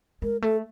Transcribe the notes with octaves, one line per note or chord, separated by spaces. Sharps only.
G#3 A#4
A3 A4